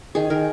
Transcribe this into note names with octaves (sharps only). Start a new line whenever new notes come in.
D#3 G#4
D#3 A#4